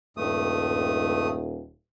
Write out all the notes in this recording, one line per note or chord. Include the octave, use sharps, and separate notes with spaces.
D#1 G2 A3 D#6